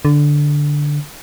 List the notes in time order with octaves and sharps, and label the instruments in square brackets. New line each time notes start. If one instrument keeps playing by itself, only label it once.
[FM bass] D3